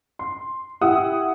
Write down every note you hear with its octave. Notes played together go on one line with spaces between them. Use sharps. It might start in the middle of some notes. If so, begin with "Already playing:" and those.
C6
E4 G4 F#5 D#6 E6